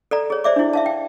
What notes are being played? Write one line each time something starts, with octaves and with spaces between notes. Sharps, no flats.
A4 D5 A#5
G#4 C#5
C5 D5 E5 D6
D4 E4
E5 F5 A5
G5